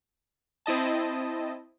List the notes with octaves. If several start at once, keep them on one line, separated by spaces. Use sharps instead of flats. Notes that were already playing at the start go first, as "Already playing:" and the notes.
C4 E4 D#5 A5